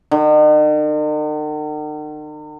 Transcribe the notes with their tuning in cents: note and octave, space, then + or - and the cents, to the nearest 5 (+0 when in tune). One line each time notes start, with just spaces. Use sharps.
D#3 -45